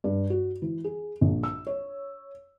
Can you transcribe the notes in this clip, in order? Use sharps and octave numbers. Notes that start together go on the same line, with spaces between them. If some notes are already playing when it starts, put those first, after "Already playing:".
G2
F#4
E3
G#4
A#1
E6
C#5